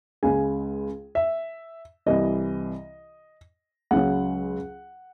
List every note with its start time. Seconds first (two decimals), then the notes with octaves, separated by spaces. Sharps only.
0.23 C#2 C#3 G#3 G#5
1.15 E5
2.06 C2 C3 E3 D#5
3.91 C#2 C#3 F#3 F#5